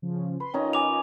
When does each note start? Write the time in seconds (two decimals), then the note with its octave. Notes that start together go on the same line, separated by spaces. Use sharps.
0.02 C#3 F3 C#4
0.40 B4 C6
0.54 D#3 C#4 D#4 F4 D#5
0.73 G#5 D6 F7